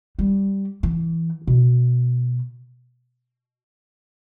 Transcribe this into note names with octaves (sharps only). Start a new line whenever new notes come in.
G3
E3
B2